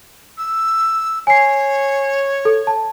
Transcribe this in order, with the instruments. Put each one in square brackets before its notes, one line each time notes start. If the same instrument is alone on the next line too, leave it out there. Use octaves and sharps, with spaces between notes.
[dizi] E6
[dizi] C#5 [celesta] G#5 C7
[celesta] A4
A5